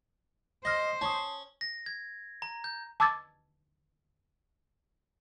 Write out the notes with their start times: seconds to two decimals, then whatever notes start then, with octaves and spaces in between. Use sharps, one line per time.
0.65 C5 D#5 F6 A#6
1.01 C#4 A5 C#6 D#6
1.61 A#6
1.86 G#6
2.42 A#5
2.64 G6
3.00 A5 D6 E6 G#6 A6